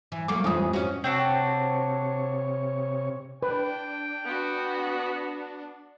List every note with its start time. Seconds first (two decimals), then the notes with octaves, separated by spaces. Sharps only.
0.12 E3
0.28 F#3 A3 A#3 D6
0.44 A1 F2 E3 G#3 D#6
0.73 C#4 F#4
1.04 C3 C4 D4 F#4 C#5
3.43 D4 B4 G5
4.25 B3 F#4